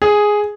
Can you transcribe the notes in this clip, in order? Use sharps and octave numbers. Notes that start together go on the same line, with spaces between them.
G#4